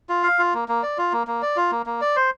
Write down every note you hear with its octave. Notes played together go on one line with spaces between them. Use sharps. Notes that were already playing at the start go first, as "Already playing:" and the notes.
F4
F5
F4
A#3
A#3
D5
F4
A#3
A#3
D5
F4
A#3
A#3
D5
C5